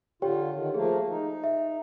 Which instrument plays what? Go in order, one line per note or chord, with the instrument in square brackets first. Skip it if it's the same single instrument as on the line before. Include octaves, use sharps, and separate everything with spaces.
[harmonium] D3 F4 [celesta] G4 C#5 G5
[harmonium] D3 D#3
[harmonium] F3 A3 A#3 [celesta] G#4
[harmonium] D#4
[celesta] E5